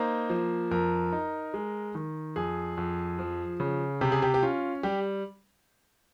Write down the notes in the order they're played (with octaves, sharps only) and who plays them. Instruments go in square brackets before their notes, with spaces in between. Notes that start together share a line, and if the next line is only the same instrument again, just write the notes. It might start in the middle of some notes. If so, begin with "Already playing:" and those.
Already playing: [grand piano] A#3 D#4 C5
F3
F2 A#4
D#4
G#3
D#3
F2 G#4
F2
F3
C#3
C3 G4
G#4
G4
G4
C#4 F4
G3 G4